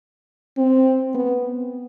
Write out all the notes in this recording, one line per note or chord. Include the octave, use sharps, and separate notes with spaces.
C4
B3